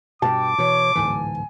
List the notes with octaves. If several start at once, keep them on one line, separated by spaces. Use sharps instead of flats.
G2 B2 G5 A5 D6
B2 E3 C#5
D1 G#2 E3 G#5